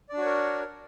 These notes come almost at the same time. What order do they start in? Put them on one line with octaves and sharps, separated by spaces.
D5 D4 F#4 C#5 A#4